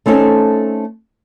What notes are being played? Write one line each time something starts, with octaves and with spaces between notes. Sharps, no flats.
A3 C4 C#4 D#4 A4